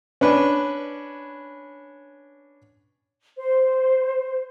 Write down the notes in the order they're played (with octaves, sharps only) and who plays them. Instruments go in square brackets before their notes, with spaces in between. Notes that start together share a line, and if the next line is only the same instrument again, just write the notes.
[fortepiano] C#4 D4 B4
[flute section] C5